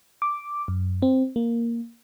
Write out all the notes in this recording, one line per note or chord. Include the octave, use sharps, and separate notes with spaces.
D6
F#2
C4
A#3